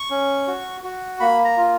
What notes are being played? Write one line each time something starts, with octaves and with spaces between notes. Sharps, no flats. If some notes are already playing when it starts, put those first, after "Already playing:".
Already playing: C#6
C#4
F#4
F#4
A#3 B5
A#5
F4